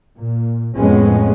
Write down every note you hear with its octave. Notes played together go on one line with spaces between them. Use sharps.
A#2
F2 A2 G#3 B3 C#4